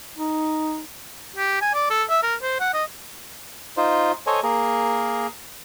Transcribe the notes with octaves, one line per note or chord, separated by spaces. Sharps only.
D#4
G4
G#5
D5
A4
E5
A#4
C5
F#5
D#5
D#4 F4 C5
A4 C5 C#5 D#5 G#5
A#3 G#4 A#4